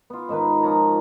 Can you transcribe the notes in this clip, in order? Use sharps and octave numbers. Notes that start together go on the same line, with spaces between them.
B3 F4
G#2 D#3 D#4 B4
F3 F4 C#5 A#5